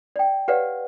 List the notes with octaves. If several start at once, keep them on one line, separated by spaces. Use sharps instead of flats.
D5 G5
G4 B4 C#5 D5 F5 F#5